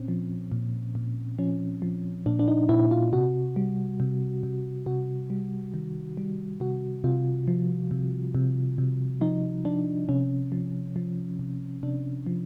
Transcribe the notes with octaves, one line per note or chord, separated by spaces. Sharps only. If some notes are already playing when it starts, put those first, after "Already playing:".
Already playing: A#2 C4 C#4
F3
A#2
A#2
F3 C#4
F3
A#2 D4
D4
D#4
A#2 E4
F4
C3 F#4
G3
C3
C3
C3 F#4
G3
D#3
G3
C3 F#4
C3 F4
F3
C3
C3
C3
F3 D#4
F3 D4
C3 C#4
F3
F3
C3
C3 D4
F3